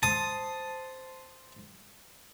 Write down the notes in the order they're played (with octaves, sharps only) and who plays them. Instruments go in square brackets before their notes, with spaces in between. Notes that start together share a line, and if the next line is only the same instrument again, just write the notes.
[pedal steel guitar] C5 A5 [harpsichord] D#6